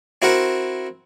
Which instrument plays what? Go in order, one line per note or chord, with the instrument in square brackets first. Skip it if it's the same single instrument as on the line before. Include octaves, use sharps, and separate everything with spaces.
[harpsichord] C4 E4 F#4 A#4 F#5